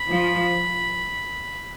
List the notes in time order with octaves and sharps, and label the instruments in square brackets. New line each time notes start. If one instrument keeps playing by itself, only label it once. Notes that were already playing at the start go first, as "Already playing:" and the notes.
Already playing: [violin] B5
[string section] F3